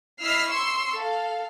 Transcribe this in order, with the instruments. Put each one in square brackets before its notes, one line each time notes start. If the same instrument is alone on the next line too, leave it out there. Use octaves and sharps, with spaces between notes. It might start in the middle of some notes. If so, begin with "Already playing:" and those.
[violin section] E4 D#5 E6 F6 B6 C7
C6 C#6 E6 C7 C#7
A4 F5